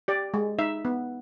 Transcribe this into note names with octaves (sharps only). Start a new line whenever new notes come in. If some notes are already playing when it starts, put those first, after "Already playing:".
G4 D5
G#3
D#4 E5
B3